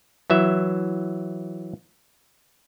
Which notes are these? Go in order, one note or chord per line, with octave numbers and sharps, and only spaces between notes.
E3 F#3 E5